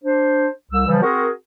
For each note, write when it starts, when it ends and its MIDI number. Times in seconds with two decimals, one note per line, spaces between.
0.04 0.47 62
0.04 0.47 72
0.72 0.87 36
0.72 0.87 88
0.88 1.00 49
0.88 1.00 52
0.88 1.00 53
0.88 1.00 55
1.03 1.30 60
1.03 1.30 66
1.03 1.30 68
1.03 1.30 70